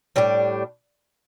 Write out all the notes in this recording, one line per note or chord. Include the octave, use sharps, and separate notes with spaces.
A2 G3 D4